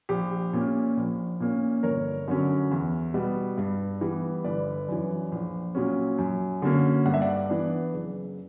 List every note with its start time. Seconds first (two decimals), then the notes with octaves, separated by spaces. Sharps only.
0.09 A#1 G4
0.53 A#2 A#3 C#4
0.97 A#1
1.40 A#2 A#3 C#4
1.83 G1 A#4 C#5
2.28 F#2 D3 F#3 C#4
2.71 E2
3.14 B2 G3 B3
3.58 G2
4.01 E3 G3 B3
4.44 G1 B4 D5
4.88 F#2 E3
5.32 A#1
5.75 A#2 F#3 C#4
6.18 F#2
6.62 D3 F#3 A#3 C#4
7.06 G2 F#5
7.14 E5
7.21 D5 F#5
7.49 E3 B3 D4
7.94 F#1